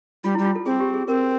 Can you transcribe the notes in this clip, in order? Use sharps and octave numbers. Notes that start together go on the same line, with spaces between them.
G3 F4
G3 E4
F4
A4
C4 G#4
G4
G#4
C4 A#4